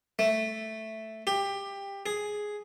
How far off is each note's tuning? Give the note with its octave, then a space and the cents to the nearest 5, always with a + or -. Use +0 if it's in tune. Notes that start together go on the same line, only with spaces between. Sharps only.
A3 +0
G4 +20
G#4 +5